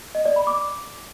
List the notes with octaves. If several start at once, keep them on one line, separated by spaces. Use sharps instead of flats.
D#5
D5
B5
D6